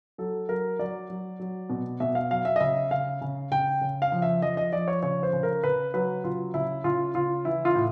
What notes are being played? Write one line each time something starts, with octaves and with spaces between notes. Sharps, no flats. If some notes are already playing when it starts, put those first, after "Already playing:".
F#3 A4
F#3 A#4
F#3 D5
F#3
F#3
B2
B2 E5
F5
F#3 F5
E5
D#5
C#3 E5
C#3 F5
C#3
C#3 G5
C#3
F5
F3
E5
F3 D#5
D#5
F3 D5
C#5
C#3 C#5
C5
C#3
A#4
C#3 B4
F#3 B4
C#3 F4
C#3 E4
C#3 F4
C#3 F4
E3 E4
F4
A2